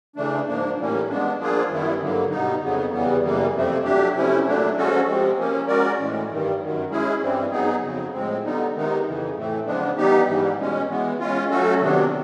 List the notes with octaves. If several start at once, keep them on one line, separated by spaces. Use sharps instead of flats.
C#3 E3 A3 D4
G#2 F3 A#3 D4
A2 E3 G3 A#3 C#4
G#3 B3 D4
F3 A#3 D4 F4 G#4
F#2 D#3 G3 B3 E4
G2 D3 F#3 A#3
B2 G3 B3 D#4
F2 C#3 F#3 B3
E2 C#3 E3 G3 B3
F#2 C#3 E3 G3 A#3
F2 C3 F3 A3 C4
F#3 A3 D4 G4
C3 F3 A3 C#4 E4
A#2 F#3 A3 D4
F3 G#3 C#4 F#4 A4
C3 F3 G#3 C4
F3 A#3 C#4
G#3 C#4 F#4 A#4 D5
A2 E3 G#3
G2 D#3 G3
F#2 D#3 F#3
G#3 C#4 E4 G#4
G2 E3 G3 C4
F#3 B3 D#4 G#4
F2 C#3 F#3
A2 F3 G#3 C4
D3 G3 B3 D#4
C3 D#3 G#3 B3 D#4
F2 C#3 E3
A2 E3 A3 C4
C#3 F3 G#3 B3 D4
E3 G3 B3 D#4 G4
G#2 E3 G3
B2 G#3 C#4
E3 G#3 B3
G#3 C#4 F4
F#3 A3 C#4 F#4 A4
C3 D#3 F#3 B3 D4